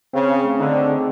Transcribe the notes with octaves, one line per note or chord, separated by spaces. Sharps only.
C#3 C4
G#4
A3
D3 D#4
C4
G#4